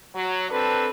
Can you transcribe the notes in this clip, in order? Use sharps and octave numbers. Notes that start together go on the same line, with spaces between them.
F#3
C4 D4 A4 B4